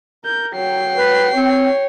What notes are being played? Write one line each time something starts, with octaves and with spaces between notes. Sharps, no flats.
A#4 G6
F#3 G5 C7
B4
C4 C#5